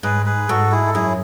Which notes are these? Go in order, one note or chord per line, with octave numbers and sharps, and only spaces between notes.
G#2 G#4 B4
G#4 B4
G#2 F#4 A4
E4 G#4
A4
F#2 E4 G#4